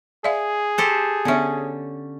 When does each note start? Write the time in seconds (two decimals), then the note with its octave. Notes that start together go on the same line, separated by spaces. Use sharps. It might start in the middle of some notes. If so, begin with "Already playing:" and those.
0.24 G#4 D5 E5 F5
0.78 G4 A4 C5
1.25 D3 B3 C#4 E5